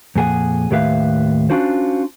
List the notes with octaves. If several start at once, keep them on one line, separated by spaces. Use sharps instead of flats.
F2 A#2 G#4 F#5
D#2 A2 G4 B4 E5 F5
C#4 D4 F4 F#4 C5